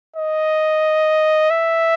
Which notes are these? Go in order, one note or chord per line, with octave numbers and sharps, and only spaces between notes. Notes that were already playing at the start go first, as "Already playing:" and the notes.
D#5
E5